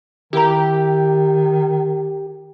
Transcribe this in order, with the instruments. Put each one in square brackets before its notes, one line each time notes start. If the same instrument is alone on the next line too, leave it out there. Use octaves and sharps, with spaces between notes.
[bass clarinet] D#3 [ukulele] E4 A#4 A#5 [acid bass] G4